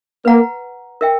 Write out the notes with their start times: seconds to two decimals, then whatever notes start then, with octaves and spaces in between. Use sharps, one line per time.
0.25 A#3 B4 F#5 A#5
1.01 A#4 E5 G5